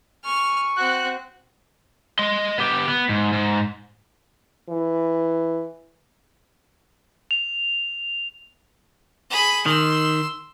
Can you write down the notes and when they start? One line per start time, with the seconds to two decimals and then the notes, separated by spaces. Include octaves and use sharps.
0.25 G#5 C#6 F6
0.77 C4 F#4 F#6
2.19 D#5 C6
2.58 B3 G4
2.88 B3
3.09 G#2
3.32 G#2
4.69 E3
7.31 F7
9.30 G#4 B5
9.66 D#3 C6 E6